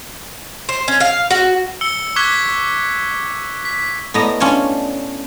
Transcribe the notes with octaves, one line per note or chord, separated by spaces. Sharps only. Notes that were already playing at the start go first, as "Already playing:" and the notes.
C5
C#4
F5
F#4
E6 C#7 G7
C#6 D6 F#6 G#6 B6 G7
B6
A2 B3 D#5 A#5
C#4 D4 F4 C#5